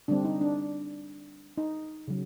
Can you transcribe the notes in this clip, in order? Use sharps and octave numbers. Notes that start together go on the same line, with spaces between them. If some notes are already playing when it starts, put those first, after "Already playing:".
D3 G3 C4 D4
D#4
D4
D#4
C#3 F#3